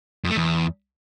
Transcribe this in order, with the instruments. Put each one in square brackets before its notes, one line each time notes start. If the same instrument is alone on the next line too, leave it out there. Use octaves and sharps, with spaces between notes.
[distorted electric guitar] F2
A3
E2